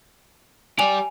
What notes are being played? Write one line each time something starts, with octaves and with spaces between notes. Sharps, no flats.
G4 D5 G#5 F7